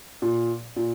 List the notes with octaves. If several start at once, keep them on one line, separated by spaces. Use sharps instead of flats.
A#2
A#2